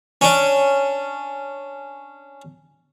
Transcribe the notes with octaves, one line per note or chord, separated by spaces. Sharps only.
C#4 D4